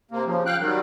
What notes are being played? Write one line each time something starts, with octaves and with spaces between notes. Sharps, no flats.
C3 A#3
C#3 F3
F5 G5 F#6
D#3 F#3 G3